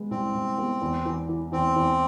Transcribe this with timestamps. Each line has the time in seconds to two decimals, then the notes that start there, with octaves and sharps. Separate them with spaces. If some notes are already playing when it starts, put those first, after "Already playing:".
Already playing: G#3 B3
0.11 C2 C4
0.34 C2
0.58 B3
0.81 E2
1.05 E3
1.29 E3
1.52 E2 C4
1.76 E2